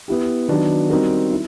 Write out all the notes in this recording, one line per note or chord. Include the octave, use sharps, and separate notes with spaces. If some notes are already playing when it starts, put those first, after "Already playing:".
B3 E4 G4
D#3 F#3 B3 D4 F#4
G3 C4 D#4 F#4 A#4
E4